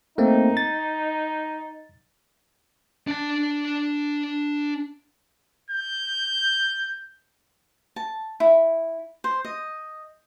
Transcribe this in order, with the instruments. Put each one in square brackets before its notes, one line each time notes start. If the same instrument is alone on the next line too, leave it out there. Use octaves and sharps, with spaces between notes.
[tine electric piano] A3 A#3 C4 [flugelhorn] D#4
[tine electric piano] A6
[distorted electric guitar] D4 A5
[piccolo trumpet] G6
[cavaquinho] A5
E4
C5
D#5